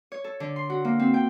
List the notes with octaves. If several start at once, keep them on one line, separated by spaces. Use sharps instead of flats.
C#5
A4
D3
C6
F#4
A#3
C4
G5